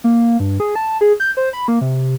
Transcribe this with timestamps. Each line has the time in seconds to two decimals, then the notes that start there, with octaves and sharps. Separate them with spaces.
0.04 A#3
0.40 G2
0.60 G#4
0.75 A5
1.01 G#4
1.20 G6
1.37 C5
1.53 B5
1.68 A#3
1.81 C3